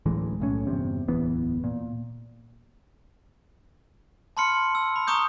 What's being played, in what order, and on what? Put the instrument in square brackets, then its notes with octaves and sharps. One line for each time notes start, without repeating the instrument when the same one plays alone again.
[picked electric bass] D1 A1 E3 G#3
B1 A2 C#4
G1 E2 C3
D1 E2 E3 B3
A#2
[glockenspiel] A5 B5 C6 F6 C#7
E6
B5
A#5 C#6 D#6 G6